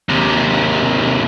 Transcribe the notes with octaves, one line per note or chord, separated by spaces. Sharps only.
D#2 C3